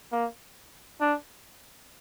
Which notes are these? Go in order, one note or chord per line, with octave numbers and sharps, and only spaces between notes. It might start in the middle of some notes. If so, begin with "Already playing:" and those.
A#3
D4